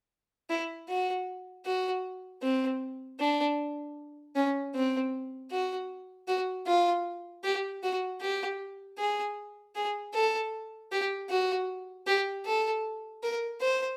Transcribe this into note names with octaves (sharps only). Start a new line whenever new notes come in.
E4
F#4
F#4
C4
D4
C#4
C4
F#4
F#4
F4
G4
F#4
G4
G#4
G#4
A4
G4
F#4
G4
A4
A#4
C5